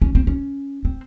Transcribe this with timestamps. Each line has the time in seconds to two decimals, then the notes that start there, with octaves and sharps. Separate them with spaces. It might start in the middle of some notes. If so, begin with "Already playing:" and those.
0.02 C#4
0.15 C4
0.27 C#4
0.85 C4